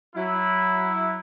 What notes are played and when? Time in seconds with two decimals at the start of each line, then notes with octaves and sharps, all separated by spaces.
0.15 F#3 E4